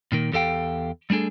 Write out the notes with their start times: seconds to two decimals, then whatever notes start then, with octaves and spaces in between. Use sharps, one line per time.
0.12 A#2 D#3 A#3
0.32 E2 G4 A4 F5 G5
1.10 G3 A3 D4 G#4 A4